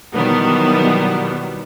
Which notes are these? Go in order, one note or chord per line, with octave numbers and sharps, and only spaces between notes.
B2 D#3 E3 F#3 G3 B3